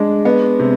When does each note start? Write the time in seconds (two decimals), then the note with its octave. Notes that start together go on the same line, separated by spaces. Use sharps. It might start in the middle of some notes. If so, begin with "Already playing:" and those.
Already playing: G#3 D4
0.25 B3
0.60 C3